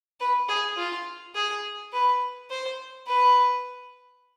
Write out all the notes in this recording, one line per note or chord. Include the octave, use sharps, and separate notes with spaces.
B4
G#4
F4
G#4
B4
C5
B4